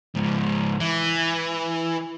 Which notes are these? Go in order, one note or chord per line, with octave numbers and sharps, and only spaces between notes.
C#2 G#2
E3